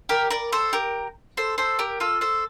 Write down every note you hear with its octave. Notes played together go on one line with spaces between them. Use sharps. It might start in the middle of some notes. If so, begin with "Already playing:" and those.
G4 A#4
A#4 D5
A4 C5
G4 A#4
A4 C5
A4 C5
G4 A#4
F4 A4
A4 C5